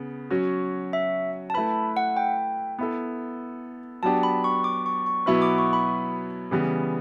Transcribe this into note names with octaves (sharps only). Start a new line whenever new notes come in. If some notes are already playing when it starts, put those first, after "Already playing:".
Already playing: C#3 B3
F#3 C#4 F#4
E5
A5
A3 E4 B4 B5
F#5
G5
B3 E4 A4
F#3 B3 D4 G4 A5
B5
C#6
D6
C#6
C#6
B2 F#3 B3 E4 B4 B5
D6
C#6
B5
C#3 E3 G3 B3